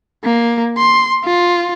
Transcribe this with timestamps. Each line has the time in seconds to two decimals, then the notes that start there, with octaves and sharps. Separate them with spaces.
0.24 A#3
0.78 C6
1.24 F4